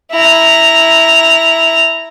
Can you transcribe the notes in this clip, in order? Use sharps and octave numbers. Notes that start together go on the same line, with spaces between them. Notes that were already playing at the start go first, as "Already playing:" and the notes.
E4 A#5